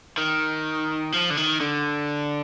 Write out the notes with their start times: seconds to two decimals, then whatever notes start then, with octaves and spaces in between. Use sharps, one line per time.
0.17 D#3
1.12 F3
1.30 D3
1.37 D#3
1.60 D3